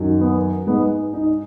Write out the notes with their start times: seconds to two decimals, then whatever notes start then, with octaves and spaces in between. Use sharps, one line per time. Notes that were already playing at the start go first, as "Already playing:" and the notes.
Already playing: F#2 D#3 F#3
0.21 B3
0.67 G#2 G#3 B3
1.14 D#4